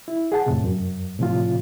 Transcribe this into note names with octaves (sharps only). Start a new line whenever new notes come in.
E4
G#4 F#5 A5
F2 A2 C3
F#2
A2 C3 F3 F4